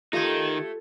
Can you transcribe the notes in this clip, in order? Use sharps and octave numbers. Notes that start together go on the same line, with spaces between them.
D#3 A3 D#4 F4 G4 A4 G#6